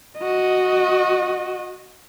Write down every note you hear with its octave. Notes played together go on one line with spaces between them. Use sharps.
F#4 D#5